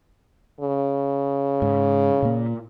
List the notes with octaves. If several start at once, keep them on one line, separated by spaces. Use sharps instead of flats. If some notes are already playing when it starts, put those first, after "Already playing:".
C#3
G#2
A#2 A#3